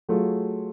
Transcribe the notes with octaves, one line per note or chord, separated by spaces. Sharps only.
F#3 A3 F4 G#4